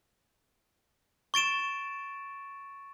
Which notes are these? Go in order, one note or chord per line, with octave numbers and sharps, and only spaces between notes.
C#6 A6 D7 E7